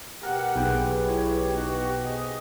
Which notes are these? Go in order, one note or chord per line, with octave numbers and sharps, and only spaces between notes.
B2 G4 A#4 F#5
B1 G#4 B4 G5
E4 C#5
B3 D#4 F#4
G#4 C5 D#5